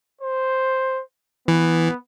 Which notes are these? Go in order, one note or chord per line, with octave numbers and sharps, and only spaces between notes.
C5
E3 B3